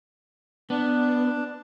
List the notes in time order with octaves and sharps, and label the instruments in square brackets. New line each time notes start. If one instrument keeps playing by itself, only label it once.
[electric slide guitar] B3 [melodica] D4